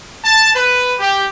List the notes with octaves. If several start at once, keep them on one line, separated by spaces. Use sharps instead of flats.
A5
B4
G4